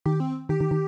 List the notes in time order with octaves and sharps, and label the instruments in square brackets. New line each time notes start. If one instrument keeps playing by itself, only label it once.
[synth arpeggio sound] D#3 [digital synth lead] G4
[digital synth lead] C4
[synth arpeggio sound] D#3 [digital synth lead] G4
[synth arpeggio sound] D#3
D#3